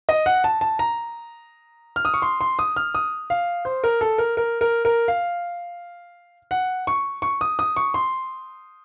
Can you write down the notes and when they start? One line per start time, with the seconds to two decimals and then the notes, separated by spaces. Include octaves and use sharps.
0.09 D#5
0.26 F#5
0.44 A5
0.61 A5
0.79 A#5
1.96 F6
2.05 D#6
2.14 C#6
2.22 C6
2.41 C6
2.59 D#6
2.76 F6
2.95 D#6
3.30 F5
3.65 C5
3.84 A#4
4.01 A4
4.18 A#4
4.37 A#4
4.61 A#4
4.85 A#4
5.08 F5
6.51 F#5
6.87 C#6
7.22 C#6
7.41 D#6
7.59 D#6
7.76 C#6
7.94 C6